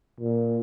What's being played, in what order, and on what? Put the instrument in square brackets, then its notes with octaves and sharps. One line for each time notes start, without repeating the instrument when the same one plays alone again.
[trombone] A#2